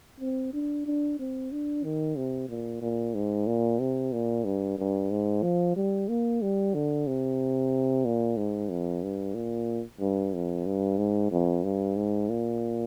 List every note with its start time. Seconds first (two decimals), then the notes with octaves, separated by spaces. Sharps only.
0.20 C4
0.53 D4
0.86 D4
1.19 C4
1.52 D4
1.84 D#3
2.17 C3
2.49 A#2
2.82 A#2
3.15 G#2
3.47 A#2
3.80 C3
4.13 A#2
4.45 G2
4.78 G2
5.11 G#2
5.43 F3
5.76 G3
6.09 A#3
6.42 G3
6.74 D3
7.07 C3
8.05 A#2
8.37 G#2
8.69 F2
9.03 G2
9.35 A#2
10.00 G2
10.34 F2
10.66 G2
10.98 G#2
11.31 F2
11.64 G2
11.96 G#2
12.29 A#2